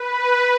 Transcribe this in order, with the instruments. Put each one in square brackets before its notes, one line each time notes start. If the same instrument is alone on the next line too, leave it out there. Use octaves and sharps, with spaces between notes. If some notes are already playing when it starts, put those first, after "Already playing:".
Already playing: [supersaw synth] B4